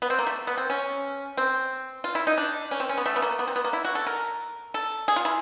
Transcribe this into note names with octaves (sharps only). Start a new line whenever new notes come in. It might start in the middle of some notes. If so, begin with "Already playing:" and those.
B3
C4
A#3
A3
B3
C4
C#4
C4
F4
E4
D#4
D4
C#4
C4
C#4
B3
A3
B3
A#3
B3
C4
B3
A#3
E4
F#4
A4
A#4
A4
G#4
F4
E4